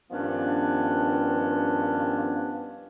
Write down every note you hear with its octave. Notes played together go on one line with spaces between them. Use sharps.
G2 D#3 F3 B3 C#4 D4